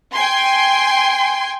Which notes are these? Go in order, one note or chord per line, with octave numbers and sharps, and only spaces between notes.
G5 G#5 C6